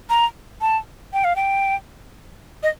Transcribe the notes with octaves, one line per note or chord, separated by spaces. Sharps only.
A#5
A5
G5
F5
G5
D#5